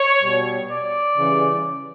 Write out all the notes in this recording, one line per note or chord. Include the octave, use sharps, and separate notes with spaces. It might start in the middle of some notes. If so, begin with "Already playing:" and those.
Already playing: C#5
B2 G3
D5
C#3 E3 G3